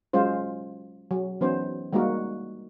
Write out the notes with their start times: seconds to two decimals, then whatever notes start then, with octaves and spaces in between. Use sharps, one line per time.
0.13 F#3 G#3 C#4 F4 C5
1.11 F#3
1.41 E3 F#3 B3 C#4 D#4 C5
1.93 G3 G#3 A#3 D#4 F#4 A#4